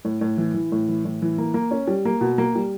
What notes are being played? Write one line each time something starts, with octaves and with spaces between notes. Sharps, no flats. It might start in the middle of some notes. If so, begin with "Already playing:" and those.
A2
A2
E3
E3
A2
E3
A2
E3
A#3
A#3
C#4
G3
A#3
B2
A#3
G3